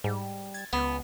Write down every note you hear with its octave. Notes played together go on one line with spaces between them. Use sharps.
G#2 G3
G#6 A6
C#2 B3